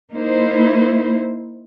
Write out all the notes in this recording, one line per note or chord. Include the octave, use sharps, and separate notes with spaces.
A#3 D#4 E4 C5